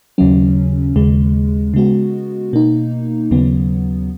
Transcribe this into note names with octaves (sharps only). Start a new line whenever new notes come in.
D#2 C#3 F#3 C#4
D#2 C#3 G#3
C#3 G#3 B3 F#4
B2 A#3 D#4
D#2 C#3 F#3 B3